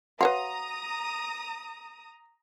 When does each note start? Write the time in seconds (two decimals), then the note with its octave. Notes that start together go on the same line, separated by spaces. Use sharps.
0.21 F#4 B4 C#5 F5 F#5 A#5 D#6